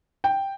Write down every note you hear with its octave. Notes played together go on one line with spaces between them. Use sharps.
G5